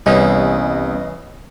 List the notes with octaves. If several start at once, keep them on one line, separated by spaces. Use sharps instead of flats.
C2 C#3 E3 G3 B3 C#4 G#4 D#5